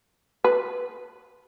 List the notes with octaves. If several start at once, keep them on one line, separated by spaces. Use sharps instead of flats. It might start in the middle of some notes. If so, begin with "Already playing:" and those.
B4